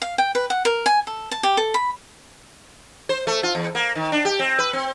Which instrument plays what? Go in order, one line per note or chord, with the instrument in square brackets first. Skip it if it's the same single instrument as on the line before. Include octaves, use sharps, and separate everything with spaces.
[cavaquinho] F5
G5
B4
F#5
A#4
G#5
A4
A5
G4
A4
B5
[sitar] C5
A3
F4
E2
A#3
D#3
D4
G4
C4
B4
C4